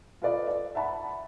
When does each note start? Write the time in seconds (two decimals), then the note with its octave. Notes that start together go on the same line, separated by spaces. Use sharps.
0.22 F4 A4 B4 D5 D#5 F5
0.48 D5
0.75 E5 F#5 A5 B5